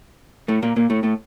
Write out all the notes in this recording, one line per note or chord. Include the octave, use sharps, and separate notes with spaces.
A2 A3
A#2 A#3
A#2 A#3
A2 A3
A2 A3